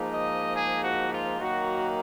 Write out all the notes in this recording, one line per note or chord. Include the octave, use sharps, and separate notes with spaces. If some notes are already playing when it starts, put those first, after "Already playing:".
Already playing: G#2 F3 A#3 D#4
D#5
G#4
F#4
F4
D#3 F#3 A#3 D#4 F#4